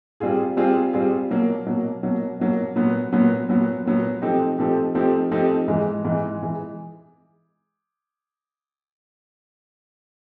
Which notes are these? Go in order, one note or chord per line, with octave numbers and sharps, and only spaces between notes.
G3 C4 F4 G#4
G3 C4 F4 G#4
G3 C4 F4 G#4
B2 F#3 A#3
B2 F#3 A#3
B2 F#3 A#3
B2 F#3 A#3
A#2 F#3 B3
A#2 F#3 B3
A#2 F#3 B3
A#2 F#3 B3
F3 A3 C4 D#4 G4
F3 A3 C4 D#4 G4
F3 A3 C4 D#4 G4
F3 A3 C4 D#4 G4
G#2 E3 G#3
G#2 E3 G#3
E3 G#3